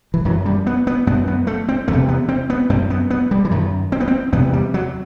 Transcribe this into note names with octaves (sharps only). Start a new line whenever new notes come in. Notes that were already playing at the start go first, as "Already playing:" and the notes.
E3
F#2 F#3
G3
B3
B3
F#2 B3
B3
A3
C4
E2 C3 A3
B3
C4
B3
F#2 C4
B3
B3
G3
E3
F#2 D#3
C4
B3
C4
E2 C3 B3
G3
F#3